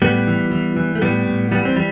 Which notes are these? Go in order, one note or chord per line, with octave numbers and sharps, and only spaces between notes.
A2 G3 B3
E3
E3
E3
A3
A2 G3 B3
A2
E3 G3 B3
C4
E3 G3